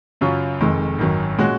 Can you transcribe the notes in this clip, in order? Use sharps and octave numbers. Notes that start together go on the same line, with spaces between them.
F#2 C#3 F#3 C#4 F4
F1 F2 D#3 G#3
G#1 F#2 D#3 F#3
A#2 G#3 C#4 F#4